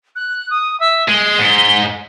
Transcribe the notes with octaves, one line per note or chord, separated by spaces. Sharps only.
F#6
D#6
E5
G#3 G7
G#2